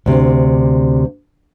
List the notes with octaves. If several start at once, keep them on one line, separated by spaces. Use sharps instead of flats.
D2 C3